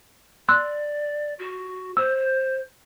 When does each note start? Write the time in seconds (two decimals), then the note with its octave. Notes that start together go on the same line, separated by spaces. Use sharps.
0.49 D5 C6 E6 F#6
1.39 F#4
1.97 C5 E6